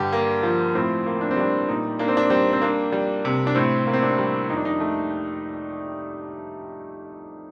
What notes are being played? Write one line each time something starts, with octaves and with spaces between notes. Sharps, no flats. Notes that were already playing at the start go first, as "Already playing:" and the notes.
Already playing: G2 D3 G4
A#3
F3
A2 C4
A#3
D4
C4
G3 D4
A#2 D#4
A#3 D4
C4
D4
G3 C4
C4
A#3 D4
G3
C3
D4
A2 C4
A#3
C4
D4
G3
F2 D#4
D4
D#4
A3